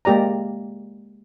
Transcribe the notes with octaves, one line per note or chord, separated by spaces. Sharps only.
G#3 A#3 G4 D5 A#5